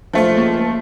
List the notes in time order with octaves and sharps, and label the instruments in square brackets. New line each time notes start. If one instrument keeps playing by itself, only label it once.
[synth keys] B1 C#6 [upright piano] F3 A3 F4
[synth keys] C#2 A#3